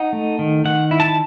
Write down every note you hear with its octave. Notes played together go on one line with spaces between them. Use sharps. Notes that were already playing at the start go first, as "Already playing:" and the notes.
Already playing: D#4 F#5
A3
D#3
D#3 F#5
E4
A5